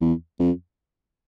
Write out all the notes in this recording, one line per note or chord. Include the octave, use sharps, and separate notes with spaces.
E2
F2